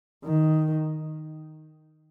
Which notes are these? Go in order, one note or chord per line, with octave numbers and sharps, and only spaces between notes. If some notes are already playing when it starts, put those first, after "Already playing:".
D#3